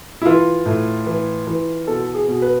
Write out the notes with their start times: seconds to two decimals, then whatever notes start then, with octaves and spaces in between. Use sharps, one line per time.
0.22 E4
0.25 E3 F4
0.66 A2
1.07 E3
1.47 E3
1.87 B2 A4
2.14 G#4
2.28 B2
2.42 B4